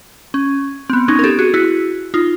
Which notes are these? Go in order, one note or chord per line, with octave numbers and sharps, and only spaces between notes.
C#4
C4
B3
C#4 D#4
A#4
G4 A4
F#4 G#4
E4 F#4
D#4 F4